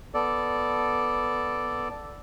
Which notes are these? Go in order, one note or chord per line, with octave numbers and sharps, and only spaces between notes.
B3 A4 D5